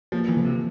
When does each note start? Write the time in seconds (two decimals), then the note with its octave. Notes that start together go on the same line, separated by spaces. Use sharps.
0.12 F3 A#3
0.28 E3
0.37 F3
0.45 C3